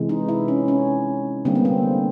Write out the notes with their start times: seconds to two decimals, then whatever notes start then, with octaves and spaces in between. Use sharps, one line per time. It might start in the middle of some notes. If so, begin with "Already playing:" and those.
Already playing: C3 E3 G#3
0.09 D#4
0.29 E4
0.48 C#4
0.68 C#4
1.45 D3 G3 A#3 C4
1.55 B3
1.65 C4